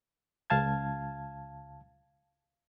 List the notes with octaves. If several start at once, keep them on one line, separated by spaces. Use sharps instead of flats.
C#2 F5 A5 G#6